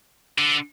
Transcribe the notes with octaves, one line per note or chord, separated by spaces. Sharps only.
D3